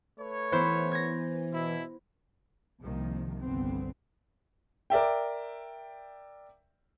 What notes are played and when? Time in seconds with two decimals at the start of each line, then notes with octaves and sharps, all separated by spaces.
0.19 A3 B4 C#5
0.52 E3 B3 E4 C5
0.92 G#6 A#6
1.52 B2 E4
2.81 C2 C3 D#3 F3 A#3
3.41 G1 C2 D3 F3 B3 C4
4.90 A#4 D5 E5 G5